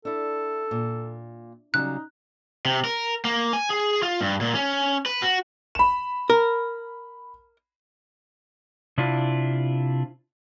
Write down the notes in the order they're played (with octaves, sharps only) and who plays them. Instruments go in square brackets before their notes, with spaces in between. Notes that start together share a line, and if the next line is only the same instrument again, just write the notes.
[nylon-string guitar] D4 E4 [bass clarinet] A4
[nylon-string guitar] A#2
[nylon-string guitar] C#3 F#3 G3 [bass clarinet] D#4 [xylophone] F#6
[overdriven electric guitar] C3
A#4
A#3
G#5
G#4
F4
G2
A#2
C#4
B4
F#4
[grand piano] B5 E7
[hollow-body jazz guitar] A#4
[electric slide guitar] C3 D4 E4 F4